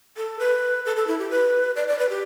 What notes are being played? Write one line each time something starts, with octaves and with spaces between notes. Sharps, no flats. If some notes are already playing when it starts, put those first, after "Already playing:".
A4
B4
A4
A4
E4
G4
B4
D5
D5
B4
G4